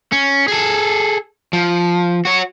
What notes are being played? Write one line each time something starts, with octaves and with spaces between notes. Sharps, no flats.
C#4
G#4 A4
F3
F#4 C#5